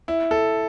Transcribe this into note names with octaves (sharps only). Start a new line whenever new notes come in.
E4
A4